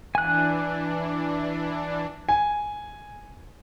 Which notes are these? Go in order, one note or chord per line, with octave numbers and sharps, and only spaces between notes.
E3 D4 G#5 F#6
G#5